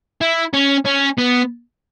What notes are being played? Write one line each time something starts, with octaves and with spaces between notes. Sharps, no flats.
E4
C#4
C#4
B3